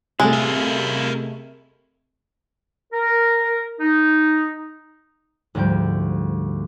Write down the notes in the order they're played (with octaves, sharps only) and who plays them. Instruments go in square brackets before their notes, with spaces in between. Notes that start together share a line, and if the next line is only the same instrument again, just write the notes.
[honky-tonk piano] C3 A3 [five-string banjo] G#3 [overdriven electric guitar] E4 F4
[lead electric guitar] A#4 E5
[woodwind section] A#4
D#4
[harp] D2 G#2 F3 G3 G5